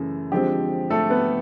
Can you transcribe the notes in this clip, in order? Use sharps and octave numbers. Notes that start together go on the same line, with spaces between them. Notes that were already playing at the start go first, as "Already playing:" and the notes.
Already playing: F#2 C#3 E3 A3
D3 F3 G#3 C4 G4
A3 A4
B3 B4